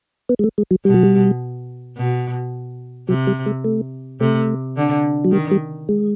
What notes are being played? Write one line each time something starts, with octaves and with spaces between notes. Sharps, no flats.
B3
G#3
A3
G#3
F#3
B2 G3
F#3
G3
B2
C3 F#3
G3
G#3
A3
C3 A3
D3
F#3
D#3 G3
G3
G#3